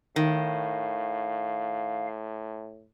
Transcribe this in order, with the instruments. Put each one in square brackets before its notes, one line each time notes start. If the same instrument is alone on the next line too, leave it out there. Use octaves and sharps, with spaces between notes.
[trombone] A2 [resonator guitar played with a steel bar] D#3 [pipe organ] F5